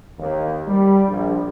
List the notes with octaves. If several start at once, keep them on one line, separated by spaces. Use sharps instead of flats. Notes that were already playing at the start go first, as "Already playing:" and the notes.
D#2
G3
A#1